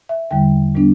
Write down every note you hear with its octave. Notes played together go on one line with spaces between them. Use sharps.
E5
E2 D3 G3 G5
A2 G3 B3 D4